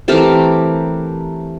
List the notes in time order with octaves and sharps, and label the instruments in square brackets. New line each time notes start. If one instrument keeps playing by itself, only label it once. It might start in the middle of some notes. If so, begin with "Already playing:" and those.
[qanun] E3 A3 C4 G4 A#4